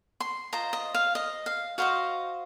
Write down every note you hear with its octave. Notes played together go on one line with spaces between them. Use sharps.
C6
F4 C5 D#5 A#5
D#5
F5
D#5
F5
F#4 C5 D#5 F5